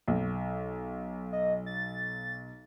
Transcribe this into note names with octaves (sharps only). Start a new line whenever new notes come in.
B1
D#5
A6